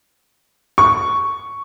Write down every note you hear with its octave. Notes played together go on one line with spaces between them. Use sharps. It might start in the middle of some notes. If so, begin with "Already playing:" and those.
C#6